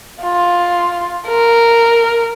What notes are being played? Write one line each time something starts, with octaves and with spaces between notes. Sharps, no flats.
F4
A#4